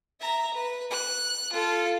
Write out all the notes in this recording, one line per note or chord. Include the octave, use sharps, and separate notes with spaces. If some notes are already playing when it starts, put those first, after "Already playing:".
E5 A#5
B4
F#6
F4 A4